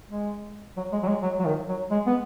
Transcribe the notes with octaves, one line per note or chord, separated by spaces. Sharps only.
G#3
F#3
G#3
F#3
G#3
F#3
F#3
D#3
F#3
G#3
B3